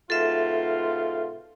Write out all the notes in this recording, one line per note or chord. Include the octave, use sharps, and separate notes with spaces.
G#2 B2 F4 A4 E5